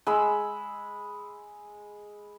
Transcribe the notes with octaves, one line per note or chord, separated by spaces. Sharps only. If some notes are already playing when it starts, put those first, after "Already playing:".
G#3 B5 E6